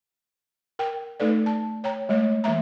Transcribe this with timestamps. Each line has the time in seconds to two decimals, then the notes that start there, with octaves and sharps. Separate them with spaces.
0.79 A#4 G5
1.20 A3 D#4 A4 B4 D5
1.46 A5
1.84 C#5 G5 A#5
2.09 G#3 A3 C#5
2.44 E3 G#3 A#3 E5 A#5